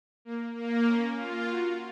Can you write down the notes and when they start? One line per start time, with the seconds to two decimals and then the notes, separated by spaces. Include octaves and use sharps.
0.25 A#3
0.55 A#3
0.86 C#4
1.16 F4
1.46 F#4